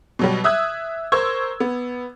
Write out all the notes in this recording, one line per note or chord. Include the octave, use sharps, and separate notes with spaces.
B2 F#3 G3
E5 D#6 E6 F#6 G#6
A#4 C5 C#6 E6 G#6
B3